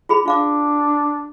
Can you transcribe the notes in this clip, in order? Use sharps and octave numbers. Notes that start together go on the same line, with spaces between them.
F4 G#4 B5
D4 F4 F5 D6